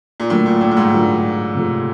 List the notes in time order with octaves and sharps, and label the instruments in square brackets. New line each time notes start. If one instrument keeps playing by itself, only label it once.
[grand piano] A#2
[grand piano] A2 [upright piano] D3 F#3 A#3 D4 F4
[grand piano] A#2
A2
A2
G#2
[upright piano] D3 F#3 A#3 D4 F4
C3 F3 A3